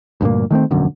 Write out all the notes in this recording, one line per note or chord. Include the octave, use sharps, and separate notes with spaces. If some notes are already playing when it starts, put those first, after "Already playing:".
D2 G2 A#2 A#3
D#3 A3 A#3 C4
E1 A#1 F#2 D3